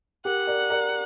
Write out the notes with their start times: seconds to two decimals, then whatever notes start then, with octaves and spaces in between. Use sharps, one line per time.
0.25 G4 A#4 F#5
0.47 A#4 D5
0.70 A#4 D5